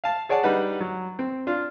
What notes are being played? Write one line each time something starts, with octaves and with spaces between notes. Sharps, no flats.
F5 A5
G#4 C#5 D5 F#5 A5
G3 D4 D#4 B4 F#5
F#3
C4
D4 F4